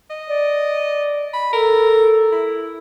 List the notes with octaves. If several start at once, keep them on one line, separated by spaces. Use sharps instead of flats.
D#5
D5
B5
A4 A#4
E4